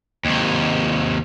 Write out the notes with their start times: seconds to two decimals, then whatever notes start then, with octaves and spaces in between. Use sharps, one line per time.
0.25 D#2 C3